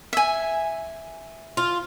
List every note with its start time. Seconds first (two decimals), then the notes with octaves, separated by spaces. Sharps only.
0.13 E5 G#5
1.57 F4